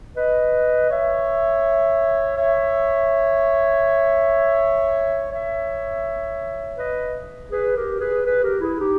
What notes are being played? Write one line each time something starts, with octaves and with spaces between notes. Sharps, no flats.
B4 D#5
C#5 E5
C#5 E5
C#5 E5
B4 D#5
G#4 B4
G4 A#4
G#4 B4
G#4 B4
G4 A#4
E4 G#4
D#4 G4